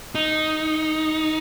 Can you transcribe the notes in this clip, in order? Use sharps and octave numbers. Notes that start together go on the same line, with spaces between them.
D#4